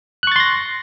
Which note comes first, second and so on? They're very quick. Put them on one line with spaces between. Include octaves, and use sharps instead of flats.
F#6 C#6 A6 C6 A#6